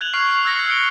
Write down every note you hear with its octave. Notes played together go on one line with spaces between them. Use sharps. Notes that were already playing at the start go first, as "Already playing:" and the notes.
F#6 G#6 F7 F#7
C#6 F6 C7 F7
C7
E6 F#6 G#6 A#6 C7 C#7
G#6 F#7
F#6 C#7 D7 G7